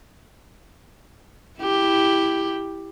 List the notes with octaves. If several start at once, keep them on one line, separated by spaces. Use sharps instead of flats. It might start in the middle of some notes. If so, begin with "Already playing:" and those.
E4 G4